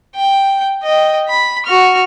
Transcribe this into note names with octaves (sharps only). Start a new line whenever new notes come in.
G5
D#5 G5
B5
F#4 F6